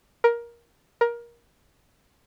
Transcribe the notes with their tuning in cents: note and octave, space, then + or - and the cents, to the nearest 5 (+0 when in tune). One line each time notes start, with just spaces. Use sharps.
A#4 +15
A#4 +20